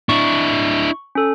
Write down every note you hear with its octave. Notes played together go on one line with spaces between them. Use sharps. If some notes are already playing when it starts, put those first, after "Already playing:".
D4 E4 C#6
C#4 A4